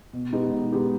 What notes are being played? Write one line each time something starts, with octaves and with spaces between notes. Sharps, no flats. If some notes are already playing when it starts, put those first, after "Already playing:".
B2
G#3 B3 D#4 G4
B2
G#3 B3 D#4 G4